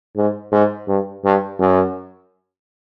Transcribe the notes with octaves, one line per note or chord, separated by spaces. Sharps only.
G#2
G#2
G2
G2
F#2